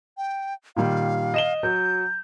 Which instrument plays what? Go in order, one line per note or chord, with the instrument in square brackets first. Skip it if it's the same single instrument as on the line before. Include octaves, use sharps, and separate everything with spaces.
[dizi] G5
[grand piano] A#2 D#3 G3 [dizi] F5
[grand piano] D#5 E7 G7
[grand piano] F#3 [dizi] G6